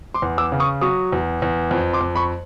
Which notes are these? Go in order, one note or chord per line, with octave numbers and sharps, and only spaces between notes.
C6 D6
E2
D6 E6
C#3
C#6 D#6
F#3 C#6 D#6
E2
E2
F2
C6 D6
F2
B5 C#6